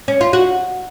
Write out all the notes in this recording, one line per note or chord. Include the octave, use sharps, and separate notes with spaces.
C#4
F4
F#4